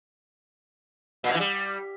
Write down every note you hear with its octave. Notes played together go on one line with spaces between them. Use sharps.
A#2
B2
E3
G3